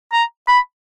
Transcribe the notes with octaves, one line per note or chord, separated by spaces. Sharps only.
A#5
B5